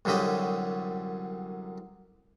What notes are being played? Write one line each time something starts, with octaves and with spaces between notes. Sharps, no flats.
C2 F#2 D3 F#3 G4 D#5